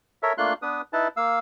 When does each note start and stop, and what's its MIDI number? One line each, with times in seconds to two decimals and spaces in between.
0.23 0.33 69
0.23 0.33 70
0.23 0.33 73
0.23 0.33 76
0.38 0.53 57
0.38 0.53 58
0.38 0.53 62
0.38 0.53 65
0.38 0.53 84
0.38 0.53 90
0.62 0.82 59
0.62 0.82 62
0.62 0.82 71
0.62 0.82 87
0.93 1.08 63
0.93 1.08 64
0.93 1.08 71
0.93 1.08 81
1.17 1.39 58
1.17 1.39 77
1.17 1.39 88